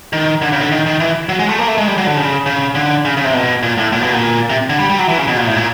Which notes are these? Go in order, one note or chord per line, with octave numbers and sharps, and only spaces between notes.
D#3
D3
C#3
D3
D#3
D#3
E3
F#3
G#3
A3
A#3
A3
G#3
G3
F#3
D3
C#3
C#3
D3
C#3
C#3
C3
B2
A#2
A2
A#2
B2
A#2
C3
D3
G3
G3
F#3
E3
C#3
B2
A#2
A2
A#2